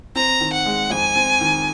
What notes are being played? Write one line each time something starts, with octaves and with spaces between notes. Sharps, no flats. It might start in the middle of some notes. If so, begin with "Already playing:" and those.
C4 A#5
D#3
F#5
G#3
F2 G#5
C4
D#3